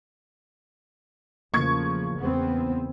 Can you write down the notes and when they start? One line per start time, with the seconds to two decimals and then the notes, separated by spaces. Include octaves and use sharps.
1.54 E2 C#3 F3 A3 A#3 C#6 G#6
2.18 E2 B3 C4